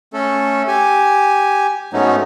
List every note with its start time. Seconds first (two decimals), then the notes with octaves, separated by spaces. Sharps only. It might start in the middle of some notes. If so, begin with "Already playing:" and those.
0.13 A3 C#4 A4
0.68 G4 G#5
1.93 G#2 F#3 A3 B3 C#4 D#4